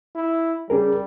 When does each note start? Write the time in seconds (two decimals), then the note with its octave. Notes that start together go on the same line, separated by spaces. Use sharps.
0.16 E4
0.70 G3 C#4 G#4 A#4